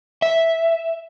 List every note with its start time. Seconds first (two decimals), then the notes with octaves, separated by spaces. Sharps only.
0.22 E5